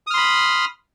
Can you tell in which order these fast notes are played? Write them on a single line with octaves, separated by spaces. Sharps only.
D#6 F6 C6 B5